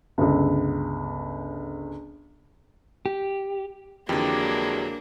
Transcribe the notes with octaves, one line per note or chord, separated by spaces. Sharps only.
G1 C#2
G4
F2 D3 E3 F#3 G#3 A#3 D4 G4